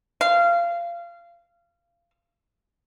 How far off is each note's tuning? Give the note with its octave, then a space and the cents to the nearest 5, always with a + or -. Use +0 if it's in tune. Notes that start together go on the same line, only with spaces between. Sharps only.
F5 -25